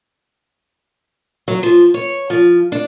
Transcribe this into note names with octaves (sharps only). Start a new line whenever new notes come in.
F#3
F3
C#5
F3
D4